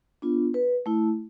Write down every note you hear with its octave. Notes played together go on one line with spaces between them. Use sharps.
B3 D4 F4
B4
A3 E4